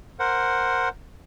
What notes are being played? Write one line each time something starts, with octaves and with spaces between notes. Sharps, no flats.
A#4 C5 F#5